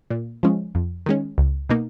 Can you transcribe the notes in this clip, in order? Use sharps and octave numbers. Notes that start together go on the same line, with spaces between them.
A#2
F3 G#3 C#4
F2
D#3 G#3 C#4
C#2
B2 A#3 D#4